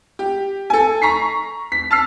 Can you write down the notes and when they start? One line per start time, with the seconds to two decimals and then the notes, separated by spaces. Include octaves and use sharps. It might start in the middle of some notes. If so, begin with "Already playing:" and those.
0.19 G4
0.70 A4 G#5
1.02 A#5 C#6 B6 C7
1.72 B6
1.91 A5 E6 F6 C7